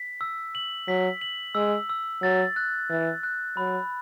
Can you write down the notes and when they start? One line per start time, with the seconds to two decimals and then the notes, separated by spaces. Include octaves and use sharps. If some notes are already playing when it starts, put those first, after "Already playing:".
Already playing: B6
0.21 E6
0.55 F#7
0.88 F#3 B6
1.21 F#7
1.55 G#3 E6
1.89 E6
2.22 F#3 A6
2.56 F#6
2.90 E3 A6
3.23 F#6
3.57 F#3 B5